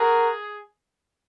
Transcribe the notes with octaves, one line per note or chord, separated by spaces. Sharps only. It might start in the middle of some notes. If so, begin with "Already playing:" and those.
Already playing: F#4 G#4 A#4